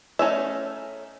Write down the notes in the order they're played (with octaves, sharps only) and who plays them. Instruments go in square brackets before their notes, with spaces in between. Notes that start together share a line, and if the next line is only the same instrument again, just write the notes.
[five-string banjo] A3 C#4 D#4 E5